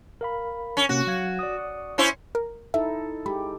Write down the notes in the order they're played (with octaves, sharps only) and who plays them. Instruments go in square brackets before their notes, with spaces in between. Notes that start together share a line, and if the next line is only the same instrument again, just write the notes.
[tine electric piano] A#4 F5 B5
[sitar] C#4
[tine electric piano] C3 A#3 C#4 [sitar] F#4
[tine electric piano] F#3 F5 G#6
D5 D#6
[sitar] C#4 E4 C5 [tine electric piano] C#5
[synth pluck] A#4
[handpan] D#4 E4 A4 [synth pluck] E5
[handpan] G#3 G4 [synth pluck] B5